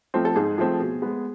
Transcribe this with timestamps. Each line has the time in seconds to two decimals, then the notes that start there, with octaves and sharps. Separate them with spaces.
0.14 F3 A3 C4
0.25 A4
0.36 G#2 G#4
0.58 F3 A3 C4
0.80 B2
1.02 G#3 B3